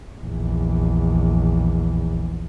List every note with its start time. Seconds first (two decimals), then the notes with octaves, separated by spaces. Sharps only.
0.20 A#1 E2